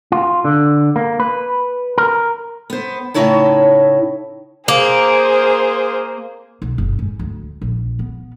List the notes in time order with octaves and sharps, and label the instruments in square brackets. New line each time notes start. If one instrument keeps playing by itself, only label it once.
[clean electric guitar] F4
D3
A#3
B4
A#4
[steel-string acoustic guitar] B3 C5
A2 C#3 D#4 E4 C#5 A5
[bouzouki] A#3 [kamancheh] G#4 C5
[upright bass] B1
F#1
G#2
D2
A#1
B3